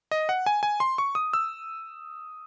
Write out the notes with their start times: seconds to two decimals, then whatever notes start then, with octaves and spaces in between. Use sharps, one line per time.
0.11 D#5
0.29 F#5
0.46 G#5
0.63 G#5
0.80 C6
0.98 C#6
1.15 D#6
1.33 E6